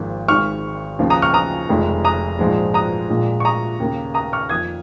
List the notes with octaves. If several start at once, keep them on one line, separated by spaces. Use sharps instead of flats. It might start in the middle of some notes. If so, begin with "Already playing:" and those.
Already playing: G#1 G#2 F3 A#3
G#1 G#2 D#3 C#6 F6
D#2 C#3 F3
A#5 D#6
C#6 F6
A#5 D#6
F1 F2 D#3 G#3
A#5 D#6
A#1 G#2 F3 G#3
A#5 D#6
A#1 A#2 G#3
C#6
A#5 D#6
D#2 C#3 A#3
A#5 D#6
C#6 F6
F2 D#3 A#3 D#6 G#6